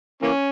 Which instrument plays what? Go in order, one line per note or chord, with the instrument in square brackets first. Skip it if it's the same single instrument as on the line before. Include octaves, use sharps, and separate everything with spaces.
[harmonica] E3 A#3 C#4